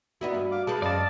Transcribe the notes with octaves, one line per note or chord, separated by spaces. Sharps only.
B3 D#4 E4 F#4 D5 B5
G2
F5 D6
G#3 C4 B4 A5 D6
F#2 D5 D#5 F5 A5